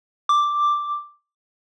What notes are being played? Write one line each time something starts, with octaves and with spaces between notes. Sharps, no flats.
D6